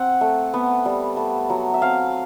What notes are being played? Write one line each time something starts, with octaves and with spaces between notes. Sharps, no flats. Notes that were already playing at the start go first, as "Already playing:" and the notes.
Already playing: C4 F#5
A3
B3
G3
A3
F#3
E5
C4 F5